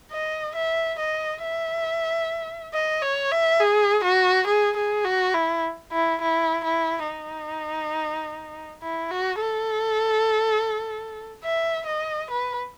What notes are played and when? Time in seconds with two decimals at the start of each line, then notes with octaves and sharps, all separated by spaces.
0.12 D#5
0.56 E5
0.99 D#5
1.43 E5
2.73 D#5
3.02 C#5
3.31 E5
3.60 G#4
4.04 F#4
4.47 G#4
4.77 G#4
5.05 F#4
5.34 E4
5.92 E4
6.22 E4
6.65 E4
7.08 D#4
8.83 E4
9.11 F#4
9.41 A4
11.44 E5
11.87 D#5
12.31 B4